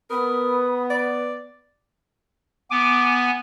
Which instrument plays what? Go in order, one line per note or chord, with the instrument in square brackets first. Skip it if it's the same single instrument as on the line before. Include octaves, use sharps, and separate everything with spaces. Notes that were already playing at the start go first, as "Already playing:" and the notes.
[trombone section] B3 [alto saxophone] A#4 [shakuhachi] B5 [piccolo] D#6
[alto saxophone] D5
[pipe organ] B3 G#5 [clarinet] D6